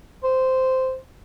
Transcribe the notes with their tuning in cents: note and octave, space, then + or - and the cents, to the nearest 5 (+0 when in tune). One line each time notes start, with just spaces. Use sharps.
C5 -10